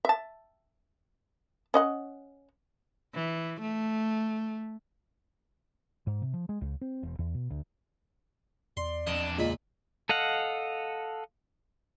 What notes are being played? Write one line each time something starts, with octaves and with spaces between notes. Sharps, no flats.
E5 A5
C#4 D#5 F#5
E3
A3
G#2
C3
F3
G#3
C#2
C4
E1
E2
B2
D2
E2 D5 C6
F2 D4 D#5
C#2 A#2 D#5 B5
A4 D#5 F5 F#5